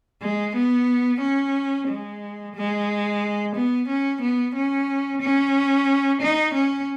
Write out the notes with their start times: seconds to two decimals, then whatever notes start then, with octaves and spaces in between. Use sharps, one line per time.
0.22 G#3
0.55 B3
1.21 C#4
1.88 G#3
2.55 G#3
3.55 B3
3.88 C#4
4.21 B3
4.55 C#4
5.21 C#4
6.21 D#4
6.54 C#4